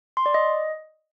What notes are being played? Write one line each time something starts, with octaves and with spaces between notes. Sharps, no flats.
C6
D5
D#5